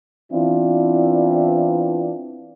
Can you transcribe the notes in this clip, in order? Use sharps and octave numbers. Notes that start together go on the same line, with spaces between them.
E3 B3 C4 D4 E4 F4